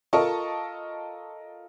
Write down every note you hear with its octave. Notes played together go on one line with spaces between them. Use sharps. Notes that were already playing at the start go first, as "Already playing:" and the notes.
F4 A4 A#4 D#5 A5 C#6